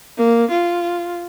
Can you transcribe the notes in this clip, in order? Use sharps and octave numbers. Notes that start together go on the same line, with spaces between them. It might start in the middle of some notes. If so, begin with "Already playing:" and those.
A#3
F4